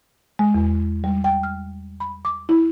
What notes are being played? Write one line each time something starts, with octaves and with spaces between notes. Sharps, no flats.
G#3
E2
G3
G5
F6
B5
D6
E4